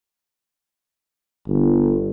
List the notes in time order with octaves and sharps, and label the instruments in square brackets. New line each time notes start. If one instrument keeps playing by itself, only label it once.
[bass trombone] G1